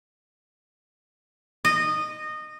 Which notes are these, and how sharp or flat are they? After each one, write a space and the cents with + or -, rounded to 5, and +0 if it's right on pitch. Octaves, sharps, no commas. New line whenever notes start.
D#5 -20